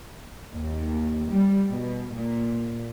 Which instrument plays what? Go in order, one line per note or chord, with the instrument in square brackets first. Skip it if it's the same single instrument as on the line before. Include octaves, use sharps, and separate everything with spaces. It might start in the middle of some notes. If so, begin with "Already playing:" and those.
[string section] D#2
G3
B2
A#2